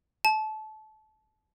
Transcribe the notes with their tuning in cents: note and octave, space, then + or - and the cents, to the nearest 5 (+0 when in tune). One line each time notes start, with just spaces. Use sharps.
A5 -25